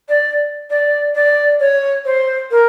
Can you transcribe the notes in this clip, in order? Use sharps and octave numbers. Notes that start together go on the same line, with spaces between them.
D5
D5
D5
C#5
C5
A#4